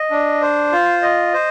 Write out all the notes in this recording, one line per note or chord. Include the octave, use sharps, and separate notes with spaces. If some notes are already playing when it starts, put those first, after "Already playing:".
Already playing: D#5
D4
C5
F4
D#5
C5